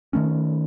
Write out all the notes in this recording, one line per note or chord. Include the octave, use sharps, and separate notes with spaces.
D#3 A3 C#4